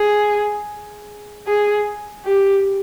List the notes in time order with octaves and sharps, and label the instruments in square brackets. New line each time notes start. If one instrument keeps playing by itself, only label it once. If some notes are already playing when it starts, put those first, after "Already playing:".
Already playing: [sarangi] G#4
G#4
G4